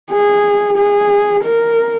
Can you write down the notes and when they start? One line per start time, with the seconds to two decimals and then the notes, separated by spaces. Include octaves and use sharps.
0.11 G#4
0.77 G#4
1.44 A#4